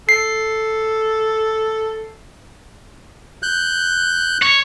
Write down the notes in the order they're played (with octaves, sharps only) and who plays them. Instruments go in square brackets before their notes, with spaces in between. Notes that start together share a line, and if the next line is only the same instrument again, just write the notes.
[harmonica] A4 [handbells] C7
[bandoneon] F#6 G6
[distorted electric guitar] C#5